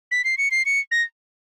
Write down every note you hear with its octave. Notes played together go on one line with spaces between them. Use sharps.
B6
C7
C#7
C7
C#7
A#6